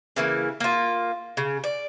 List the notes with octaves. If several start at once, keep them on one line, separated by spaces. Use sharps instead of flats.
C#3 E3 A#3
A#3 F4
C#3
D5